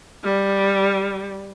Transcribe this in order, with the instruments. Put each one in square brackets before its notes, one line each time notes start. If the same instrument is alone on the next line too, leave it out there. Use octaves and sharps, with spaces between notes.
[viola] G3